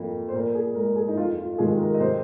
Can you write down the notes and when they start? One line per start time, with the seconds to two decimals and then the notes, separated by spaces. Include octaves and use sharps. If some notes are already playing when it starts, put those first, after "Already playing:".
Already playing: F2 F3 A#3
0.28 C5
0.33 A#2 A#4
0.55 G#4
0.75 G#3 A#4
0.96 G#4
1.08 D#4
1.17 F2 F4
1.38 F4
1.53 F4
1.58 C3 D#3 G#3 G#4
1.79 A#4
1.94 D#5
2.00 C3 C5